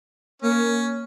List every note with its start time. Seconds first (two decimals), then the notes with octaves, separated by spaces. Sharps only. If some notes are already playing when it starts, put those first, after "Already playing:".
0.42 A#3 C#4